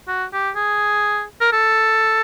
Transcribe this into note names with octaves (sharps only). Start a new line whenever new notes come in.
F#4
G4
G#4
A#4
A4